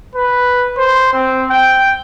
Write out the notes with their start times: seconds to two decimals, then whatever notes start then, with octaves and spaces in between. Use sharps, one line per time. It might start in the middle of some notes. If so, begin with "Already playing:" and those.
0.16 B4
0.78 C5
1.13 C4
1.50 G5